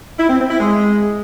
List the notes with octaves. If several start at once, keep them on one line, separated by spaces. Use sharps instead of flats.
E4
C4
C4
E4
G#3